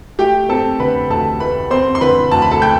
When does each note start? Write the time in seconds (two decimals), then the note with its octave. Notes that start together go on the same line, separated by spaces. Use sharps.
0.19 A3 G4 G5
0.49 C4 A4 A5
0.80 D3 B4 B5
1.10 D2 A4 A5
1.40 A3 B4 B5
1.71 C4 C5 C6
1.95 C6
2.01 D3 B4 B5
2.32 D2 A5
2.42 B5
2.51 A4 A5
2.62 A3 G5 G6